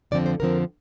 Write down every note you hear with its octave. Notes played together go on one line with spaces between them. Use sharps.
F2 D3 F3 C4 D5
C5
F2 D3 F3 C4 A#4